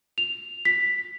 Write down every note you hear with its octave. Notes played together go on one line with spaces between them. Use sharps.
F7
B6